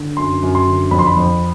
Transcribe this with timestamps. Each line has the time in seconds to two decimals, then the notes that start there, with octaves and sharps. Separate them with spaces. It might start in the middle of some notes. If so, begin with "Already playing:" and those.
Already playing: D3
0.17 F#2 C6
0.43 F#2
0.55 C6
0.66 D3
0.91 F2 B5
0.99 C6
1.07 B5
1.16 F2